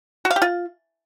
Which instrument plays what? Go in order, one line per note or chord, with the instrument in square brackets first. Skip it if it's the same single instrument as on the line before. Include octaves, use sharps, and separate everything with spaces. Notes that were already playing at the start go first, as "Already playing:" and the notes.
[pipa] F#4
F5
G4
F4